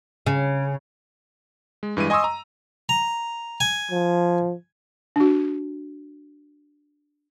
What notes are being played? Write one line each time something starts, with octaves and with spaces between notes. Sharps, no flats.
C#3
G#3
G2 E3 G#3 D#7
D#5 G#5 C6 C#6 D#6 E6
A#5
A#5
G#5
F3
D4 F#4